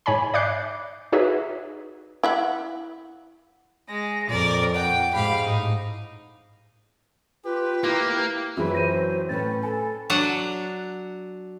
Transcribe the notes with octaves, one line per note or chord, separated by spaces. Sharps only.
G#2 C#5 G#5 B5
D5 E5 D6 F#6 G6 C7
D#4 F#4 G#4 B4 C#5 E5
E4 E5 F#5
G#3 A#6
F2 A#2 A#4 D5
F#5 G5
G#2 G4 F5 B5
A2 D#4
F4 G4 B4
A#3 E4 G4
F#2 E3 F#3 C4 F4 G#4 B4 E5
C5 A#6 D#7
A2 C4 C#4 B4 A6
A4 G#5 B5
F#3 D4 F#5